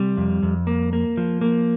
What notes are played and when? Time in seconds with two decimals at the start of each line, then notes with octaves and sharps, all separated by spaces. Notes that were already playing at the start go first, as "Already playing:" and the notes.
Already playing: C3 G3
0.17 F2
0.42 F2
0.67 A#3
0.93 A#3
1.17 F3
1.41 A#3